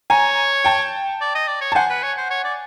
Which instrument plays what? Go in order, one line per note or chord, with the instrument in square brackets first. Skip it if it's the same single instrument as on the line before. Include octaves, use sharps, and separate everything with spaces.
[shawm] C#5 [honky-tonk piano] G#5 A#5
[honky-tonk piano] G5 A5
[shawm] D5
D#5
D5
C#5
[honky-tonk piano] A5
[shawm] C5 [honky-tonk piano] F#5 G#5
[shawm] B4
C#5
C5
C#5
D5